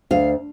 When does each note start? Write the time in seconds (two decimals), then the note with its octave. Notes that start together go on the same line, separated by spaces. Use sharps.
0.11 D2 F5